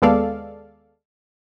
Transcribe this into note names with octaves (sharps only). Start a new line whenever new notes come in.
D#2 G#3 B3 A4 D5 F5